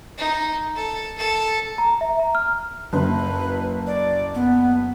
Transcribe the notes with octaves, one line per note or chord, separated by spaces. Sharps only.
D#4
A4
A4
A#5
E5
A#5
F6
F#1 B4
D5
B3